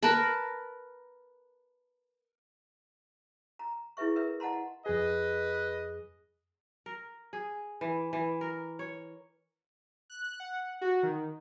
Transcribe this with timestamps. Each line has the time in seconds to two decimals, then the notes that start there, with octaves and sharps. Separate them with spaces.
0.03 A#4 B4 A5 B5
3.59 A#5
3.97 E4 G#4 B4 E5 C#6
4.16 A#4 B4 E5
4.40 D#5 F#5 A5 A#5 C6
4.86 F2 G#4 B4 D#5
6.86 A#4
7.33 G#4
7.81 E3
8.13 E3
8.41 A#4
8.79 C#5
10.10 F#6
10.40 F#5
10.81 F#4
11.03 D#3